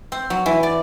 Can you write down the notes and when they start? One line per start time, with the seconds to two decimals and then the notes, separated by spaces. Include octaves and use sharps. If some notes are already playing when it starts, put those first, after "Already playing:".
0.12 C4
0.30 F#3
0.46 E3
0.63 D5